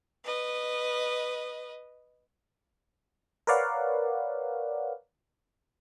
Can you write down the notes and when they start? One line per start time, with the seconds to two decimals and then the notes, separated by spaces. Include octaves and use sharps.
0.24 B4 D#5
3.47 A#4 B4 C#5 D5 F5 F#5